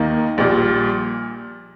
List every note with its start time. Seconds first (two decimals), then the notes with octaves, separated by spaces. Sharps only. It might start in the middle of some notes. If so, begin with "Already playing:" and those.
Already playing: D#2 D#3 A#3
0.38 A#1 A#2 G3